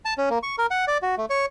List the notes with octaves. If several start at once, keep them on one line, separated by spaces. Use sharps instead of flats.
A5
C#4
A#3
C#6
A#4
F#5
D5
F#4
A3
C#5